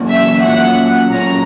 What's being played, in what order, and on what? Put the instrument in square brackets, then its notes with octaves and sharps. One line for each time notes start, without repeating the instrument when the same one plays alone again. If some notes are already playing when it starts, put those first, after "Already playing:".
Already playing: [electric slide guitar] F#2 E3 A#3 C#4 F#4
[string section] E5
[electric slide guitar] A#2 F#3 C#4 [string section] F#5
[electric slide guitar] A#2 F#3 C#4 [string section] A#5